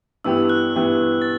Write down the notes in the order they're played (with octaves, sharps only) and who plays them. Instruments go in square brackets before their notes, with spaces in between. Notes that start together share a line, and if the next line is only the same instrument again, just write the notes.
[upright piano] G2 E3 B3 E4 G4 [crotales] E6
[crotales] F#6
[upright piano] G2 E3 B3 E4 G4
[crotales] A6